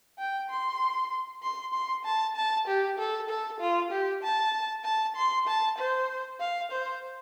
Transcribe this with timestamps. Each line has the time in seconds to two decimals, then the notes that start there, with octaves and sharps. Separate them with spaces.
0.18 G5
0.50 C6
1.43 C6
1.74 C6
2.05 A5
2.36 A5
2.67 G4
2.98 A4
3.29 A4
3.60 F4
3.91 G4
4.23 A5
4.84 A5
5.16 C6
5.47 A5
5.78 C5
6.40 F5
6.71 C5